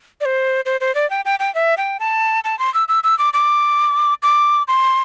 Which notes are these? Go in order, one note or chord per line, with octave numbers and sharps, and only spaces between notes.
D5
C5
C5
C5
D5
G5
G5
G5
E5
G5
A5
A5
C6
E6
E6
E6
D6
D6
D6
C6